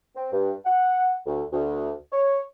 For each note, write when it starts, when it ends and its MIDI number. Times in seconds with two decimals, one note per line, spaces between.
0.16 0.30 60
0.32 0.53 43
0.65 1.14 78
1.26 1.42 38
1.52 1.92 38
2.12 2.40 73